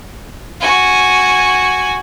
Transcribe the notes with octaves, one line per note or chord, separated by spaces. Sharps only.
F#4 G#5